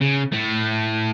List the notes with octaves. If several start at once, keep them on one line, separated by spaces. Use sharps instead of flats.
C#3
A2 A3